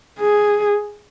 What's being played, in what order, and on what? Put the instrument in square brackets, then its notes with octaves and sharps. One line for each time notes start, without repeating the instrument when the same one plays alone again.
[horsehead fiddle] G#4